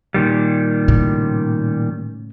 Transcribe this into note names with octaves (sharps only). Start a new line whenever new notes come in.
A#2 D#3 G3
A2 C#3